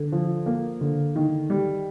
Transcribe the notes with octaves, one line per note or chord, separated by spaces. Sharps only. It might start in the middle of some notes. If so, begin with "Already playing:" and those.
Already playing: D3
F3
A#3
D3
D#3
G3